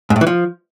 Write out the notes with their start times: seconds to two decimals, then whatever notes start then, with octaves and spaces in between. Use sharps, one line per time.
0.10 G#2
0.16 A2
0.21 E3
0.27 F3